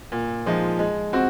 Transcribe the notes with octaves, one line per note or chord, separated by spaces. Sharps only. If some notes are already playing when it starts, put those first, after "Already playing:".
A#2
F3 G#3 D#4
G#3
C4 F#4